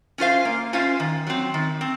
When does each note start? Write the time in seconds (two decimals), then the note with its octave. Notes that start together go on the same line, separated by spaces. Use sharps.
0.18 C#4 F4 C5 F5
0.45 A#3
0.73 C#4 F4 C5 F5
1.00 D#3
1.27 F#3 C4
1.54 D#3
1.81 C4